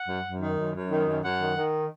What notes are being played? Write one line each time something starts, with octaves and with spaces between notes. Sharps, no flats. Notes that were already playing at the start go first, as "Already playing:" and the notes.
Already playing: F#5
F#2
F#2
D#3
F#2
F#2
D#3
F#2
F#2 F#5
D#3
D#3